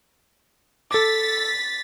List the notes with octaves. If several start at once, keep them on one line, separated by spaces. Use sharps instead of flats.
A4 D6 A6 B6